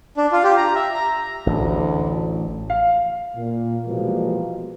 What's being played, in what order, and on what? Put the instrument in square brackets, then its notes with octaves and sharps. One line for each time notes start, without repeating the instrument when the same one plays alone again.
[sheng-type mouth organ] D4
F4
G4
A#5
E5
A#5
[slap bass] A1 [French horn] D2
[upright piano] F5
[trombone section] A#2
B2 E3 F3 G3 G#3 A#3